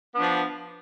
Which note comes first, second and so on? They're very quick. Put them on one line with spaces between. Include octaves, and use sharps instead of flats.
B3 D4 F3